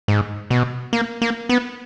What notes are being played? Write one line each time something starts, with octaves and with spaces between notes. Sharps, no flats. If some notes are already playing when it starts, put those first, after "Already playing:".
G#2
B2
A#3
A#3
B3